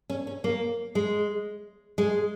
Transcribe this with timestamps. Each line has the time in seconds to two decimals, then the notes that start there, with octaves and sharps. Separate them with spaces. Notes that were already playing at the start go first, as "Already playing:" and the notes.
0.10 C#4
0.27 C#4
0.44 A#3
0.95 G#3
1.98 G#3